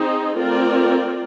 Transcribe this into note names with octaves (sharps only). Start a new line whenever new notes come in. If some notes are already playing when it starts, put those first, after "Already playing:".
Already playing: C4 D#4 G#4 C5
A3 C4 F4 A#4 D5